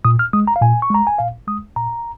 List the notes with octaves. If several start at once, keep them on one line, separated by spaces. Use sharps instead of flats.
A#2 D#6
F6
G#3 D#6
A#5
F5
A#2 G#5
C#6
G#3 A#5
G#5
A#2 F5
G#3 D#6
A#2 A#5